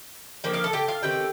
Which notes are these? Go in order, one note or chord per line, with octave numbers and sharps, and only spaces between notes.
F3 A#3 D4 G5
F4 F5
A4 A5
G4 G5
F4 F5
D#3 A3 C4 G4 G5